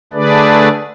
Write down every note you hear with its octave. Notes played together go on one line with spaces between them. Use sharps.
D3 A3 D4 G#4 B4 D5